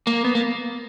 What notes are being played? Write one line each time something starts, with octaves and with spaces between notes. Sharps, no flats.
A#3
B3
A#3